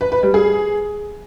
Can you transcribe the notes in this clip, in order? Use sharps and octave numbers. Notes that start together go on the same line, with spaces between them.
B4
B4
G3
G#4